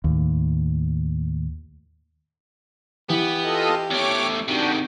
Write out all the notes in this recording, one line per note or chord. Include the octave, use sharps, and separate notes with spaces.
D#2 A2
E3 B3 G4
F4 A4 D#5
E2 A3 C#5 D6
C3 D#3 D4 F#4 G4